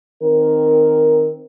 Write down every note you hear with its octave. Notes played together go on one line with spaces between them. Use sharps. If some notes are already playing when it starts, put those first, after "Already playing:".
D#3 C4 A#4